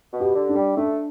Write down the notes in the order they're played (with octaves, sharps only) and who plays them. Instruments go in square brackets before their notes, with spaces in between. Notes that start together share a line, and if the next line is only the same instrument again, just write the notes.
[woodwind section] B2
[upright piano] G4
[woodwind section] D3
[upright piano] D4
[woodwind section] G3
[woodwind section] A3 [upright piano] D4